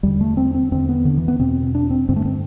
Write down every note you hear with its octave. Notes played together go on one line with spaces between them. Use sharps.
E2 D3 G3
A3
C4
C4
E2 D3 C4
B3
D3
E3
B3
E2 B2 C4
D4
C4
G2 D3 C4
A3
C4